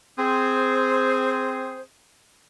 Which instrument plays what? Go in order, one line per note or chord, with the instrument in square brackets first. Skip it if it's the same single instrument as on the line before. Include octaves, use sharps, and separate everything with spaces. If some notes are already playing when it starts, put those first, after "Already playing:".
[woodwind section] C4 G#4 C5